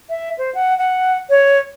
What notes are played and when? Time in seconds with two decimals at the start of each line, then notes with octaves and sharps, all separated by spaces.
0.09 E5
0.38 C5
0.55 F#5
0.78 F#5
1.30 C#5